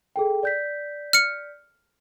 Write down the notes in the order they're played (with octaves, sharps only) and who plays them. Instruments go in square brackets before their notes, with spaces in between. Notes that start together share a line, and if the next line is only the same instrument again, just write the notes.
[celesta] G#4 A4 G5
D5 G6 B6
[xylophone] F6 C#7